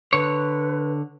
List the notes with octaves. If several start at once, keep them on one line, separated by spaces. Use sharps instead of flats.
D3 B4 C#5